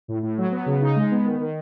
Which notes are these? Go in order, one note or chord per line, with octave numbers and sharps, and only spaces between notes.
A2
A2
F#3
B3
C#3
D#4
G#3
B3
D#3
D#3